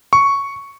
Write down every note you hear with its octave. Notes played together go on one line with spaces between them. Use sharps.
C#6